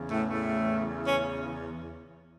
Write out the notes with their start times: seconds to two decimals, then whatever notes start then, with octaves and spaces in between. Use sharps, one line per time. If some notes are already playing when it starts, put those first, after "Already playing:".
Already playing: E2 C#3 E3
0.09 A2 A3
0.29 A2 A3
1.05 C#4